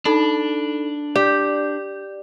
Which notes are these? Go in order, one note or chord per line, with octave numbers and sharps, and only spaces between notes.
D4 D#4 A4 B5
G4 D5 G6